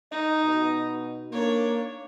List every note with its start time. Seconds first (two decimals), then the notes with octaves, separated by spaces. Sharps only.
0.11 D#4 D#5
0.45 B2
1.32 A#3 D4 C#5